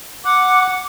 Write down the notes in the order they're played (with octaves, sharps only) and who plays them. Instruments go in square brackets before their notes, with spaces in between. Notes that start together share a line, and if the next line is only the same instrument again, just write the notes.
[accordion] F#5 [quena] D6